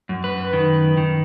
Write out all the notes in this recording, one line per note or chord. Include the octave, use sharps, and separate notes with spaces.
F#2
B4
D#3
D#3